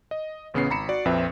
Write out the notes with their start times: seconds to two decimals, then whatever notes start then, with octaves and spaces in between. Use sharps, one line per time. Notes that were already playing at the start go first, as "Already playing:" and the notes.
0.11 D#5
0.54 A1 C#3 B3 C#4 C7
0.70 G#1 A#5 B5 C#7 E7
0.89 F#4 D5
1.05 A#1 F2 C4 B4 E5